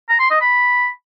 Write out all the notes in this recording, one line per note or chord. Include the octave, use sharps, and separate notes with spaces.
A#5
C6
D#5
B5